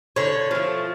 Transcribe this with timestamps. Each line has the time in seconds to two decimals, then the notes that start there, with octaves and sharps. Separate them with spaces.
0.16 D3 C#5
0.51 F3 A3